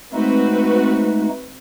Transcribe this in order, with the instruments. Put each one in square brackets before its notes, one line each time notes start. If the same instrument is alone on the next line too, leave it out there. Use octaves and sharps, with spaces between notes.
[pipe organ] G#3 A3 D#4 [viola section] C4 F#4 B4